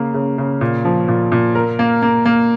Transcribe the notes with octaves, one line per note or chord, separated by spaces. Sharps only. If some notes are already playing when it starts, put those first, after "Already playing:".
Already playing: C#3 A#3
C#3
C#3
A#2
F3
A#2
A#2
A#4
A#3
A#3
A#3